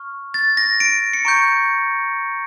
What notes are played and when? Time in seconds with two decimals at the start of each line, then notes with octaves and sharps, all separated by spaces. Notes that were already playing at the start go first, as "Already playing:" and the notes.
Already playing: C#6 F6
0.34 A6
0.57 A#6
0.80 D7
1.13 C#7
1.25 A#5 C#6 G6 D7